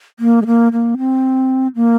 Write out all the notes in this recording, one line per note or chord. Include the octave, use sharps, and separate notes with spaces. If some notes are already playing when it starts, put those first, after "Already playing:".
A#3
G#3
A#3
A#3
C4
A#3